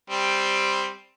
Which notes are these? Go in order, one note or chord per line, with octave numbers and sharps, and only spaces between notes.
G3 C4